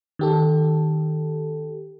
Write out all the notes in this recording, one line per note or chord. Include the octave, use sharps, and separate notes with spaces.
D#3 G4 A4